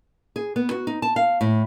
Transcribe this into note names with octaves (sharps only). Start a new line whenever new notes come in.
G#4
B3
F#4
D#4
A5
F5
A2